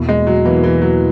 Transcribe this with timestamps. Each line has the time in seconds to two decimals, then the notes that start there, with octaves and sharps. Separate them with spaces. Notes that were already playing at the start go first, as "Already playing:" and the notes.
Already playing: E2 B2 A#3 E4
0.09 G#3
0.27 F#3
0.45 E2 B2 E3 A#3 E4
0.64 E3
0.82 F#3